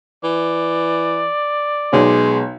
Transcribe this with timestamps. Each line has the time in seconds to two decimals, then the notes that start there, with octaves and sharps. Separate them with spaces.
0.24 E3 D5
1.93 B1 G#3